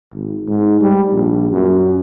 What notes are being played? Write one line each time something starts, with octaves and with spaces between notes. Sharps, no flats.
G#1
G#2
G3
A#1
F#2